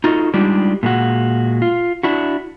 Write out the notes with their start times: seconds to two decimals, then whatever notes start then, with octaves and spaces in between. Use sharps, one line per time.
0.04 D#4 F4 F#4 A4 D#5
0.34 G3 G#3 D4 D#4 F4 G4
0.83 A#2 G#3 F#4
1.62 F4
2.03 D4 E4 F#4